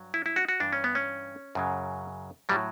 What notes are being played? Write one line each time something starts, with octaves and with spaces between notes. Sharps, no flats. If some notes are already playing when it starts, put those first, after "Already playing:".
Already playing: G2 F#3
E4
E4
F#4
F#4
G2 E3 D4
C#4
B3
C#4
F#2 C#3 F#3
A2 F#3 G3